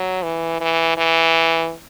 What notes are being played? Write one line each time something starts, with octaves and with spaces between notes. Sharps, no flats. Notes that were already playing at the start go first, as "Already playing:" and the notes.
Already playing: F#3
E3
E3
E3